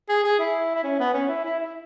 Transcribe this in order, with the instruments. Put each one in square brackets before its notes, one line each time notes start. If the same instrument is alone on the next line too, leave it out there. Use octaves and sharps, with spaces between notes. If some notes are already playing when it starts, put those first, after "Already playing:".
[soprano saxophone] G#4
G#4
E4
E4
C#4
B3
C#4
E4
E4
E4